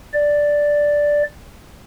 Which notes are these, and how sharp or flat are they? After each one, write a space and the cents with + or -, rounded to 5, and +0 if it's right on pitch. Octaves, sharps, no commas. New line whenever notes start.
D5 +0